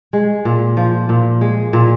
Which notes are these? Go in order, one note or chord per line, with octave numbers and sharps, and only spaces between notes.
G#3
A#2
F3
A#2
G#3
A#2